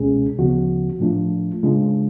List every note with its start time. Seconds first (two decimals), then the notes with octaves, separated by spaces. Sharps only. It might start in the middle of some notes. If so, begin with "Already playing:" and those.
Already playing: C#2 B2 G#3 C#4 G#4
0.38 D2 C#3 F3 B3 F#4
1.00 A2 F3 A3 D4 F4
1.63 C#3 G#3 D4 F4